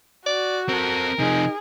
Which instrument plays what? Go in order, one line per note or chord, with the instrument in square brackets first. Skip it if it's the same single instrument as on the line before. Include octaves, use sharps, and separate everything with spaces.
[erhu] F#4 [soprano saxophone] D5
[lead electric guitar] C4 A4 [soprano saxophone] A#4
[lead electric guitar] C3 F3 [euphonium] D#4 [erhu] G#4